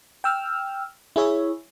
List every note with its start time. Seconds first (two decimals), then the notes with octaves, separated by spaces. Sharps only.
0.24 G5 E6 F6
1.16 E4 G#4 C#5 E5